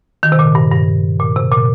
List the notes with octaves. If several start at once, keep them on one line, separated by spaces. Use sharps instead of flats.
D#3
C3
A#2
G2
G2
A#2
C3
A#2